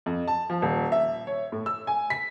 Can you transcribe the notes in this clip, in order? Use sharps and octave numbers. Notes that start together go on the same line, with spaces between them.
F2
A5
F3
D#1
E5
C#5
A2
E6
G#5
B6